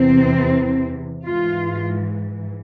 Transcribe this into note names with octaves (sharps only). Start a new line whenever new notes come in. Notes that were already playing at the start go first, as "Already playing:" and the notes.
Already playing: E2 C3 E3 C4
G#2 E3 F4